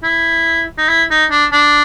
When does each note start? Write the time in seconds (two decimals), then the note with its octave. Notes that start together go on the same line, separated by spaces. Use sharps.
0.03 E4
0.78 D#4
0.89 E4
1.11 D#4
1.31 D4
1.52 D4